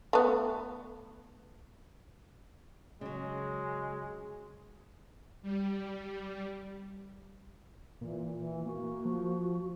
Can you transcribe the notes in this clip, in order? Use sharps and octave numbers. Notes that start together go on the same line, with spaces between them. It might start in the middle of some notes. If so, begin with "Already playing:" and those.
A3 B3
C#3 F#3 G#3
G3
A#2 E3
E3
A#3 F#4
F3